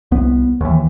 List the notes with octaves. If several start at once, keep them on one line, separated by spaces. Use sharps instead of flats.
C2 B3
D#2 E3